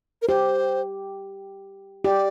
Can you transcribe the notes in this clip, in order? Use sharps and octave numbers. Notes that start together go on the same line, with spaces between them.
A#4
G4 C5
G4 D5